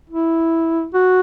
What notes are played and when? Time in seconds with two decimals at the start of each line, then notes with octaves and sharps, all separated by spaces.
0.10 E4
0.94 F#4